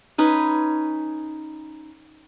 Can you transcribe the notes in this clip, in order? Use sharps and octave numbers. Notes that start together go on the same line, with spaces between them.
C#4 D#4 B4